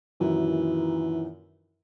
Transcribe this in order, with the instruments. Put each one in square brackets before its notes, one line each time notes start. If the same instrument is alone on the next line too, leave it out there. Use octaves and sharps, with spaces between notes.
[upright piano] F#2 A#2 D#3 [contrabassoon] E3